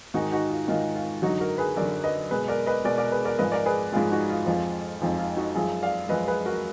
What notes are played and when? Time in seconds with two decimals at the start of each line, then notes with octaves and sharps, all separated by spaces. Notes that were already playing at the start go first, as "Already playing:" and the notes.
0.14 G#2 D#3 G#3 D#4 F#4
0.32 D#4 F#4
0.50 F4
0.68 G#2 D#3 G#3 F4
0.96 F4
1.22 F#2 D3 F#3 D#4 F#4
1.40 F#4 A#4
1.58 G#4 B4
1.77 F#2 D3 F#3 A#4 D5
2.04 B4 D#5
2.31 B2 G#3 G#4 B4
2.48 A#4 D5
2.66 B4 D#5
2.85 B2 G#3 A#4 D5
2.98 A#4 D5
3.11 G#4 B4
3.25 A#4 D5
3.39 G#2 F3 G#3 B4 D#5
3.52 A#4 D5
3.66 G#4 B4
3.93 G#2 F3 G#3 F4 G#4
4.11 D#4 F#4
4.30 F4
4.46 F2 F3 G#3
5.01 F2 F3 G#3 D#4
5.19 F4
5.36 D#4 F#4
5.55 F#2 F3 G#3 F4 G#4
5.83 D5 F5
6.09 F#2 F3 G#3 B4 D#5
6.28 G#4 B4
6.46 F#4 A#4